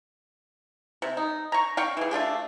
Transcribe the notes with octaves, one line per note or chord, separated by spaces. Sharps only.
C3
D#4
A#5 C#6
F5 G5 C#6
E3 G#4
A3 D4 F4 G4